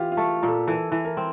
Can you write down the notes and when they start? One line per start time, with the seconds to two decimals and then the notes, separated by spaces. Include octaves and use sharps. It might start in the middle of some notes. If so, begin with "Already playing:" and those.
Already playing: E3 F4 G4
0.12 F4
0.17 A3
0.43 A#2
0.48 A4
0.67 E3 A4
0.92 E3
1.05 A#4
1.17 C4